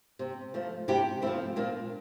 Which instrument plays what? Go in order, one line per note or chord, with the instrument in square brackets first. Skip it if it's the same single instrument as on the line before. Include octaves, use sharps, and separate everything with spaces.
[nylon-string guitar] C3
F3 A3
C3 E4 G4
F3 A3 C4 E4
A#2 A#3 D4